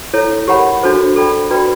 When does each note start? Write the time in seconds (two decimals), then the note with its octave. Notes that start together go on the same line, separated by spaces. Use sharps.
0.13 E4 A4 C#5
0.48 G4 A#4 C#5 F#5 B5
0.82 D4 F#4 A4 C5 D#5
1.16 A4 D5 G5 B5
1.51 F#4 B4 D5 G5 B5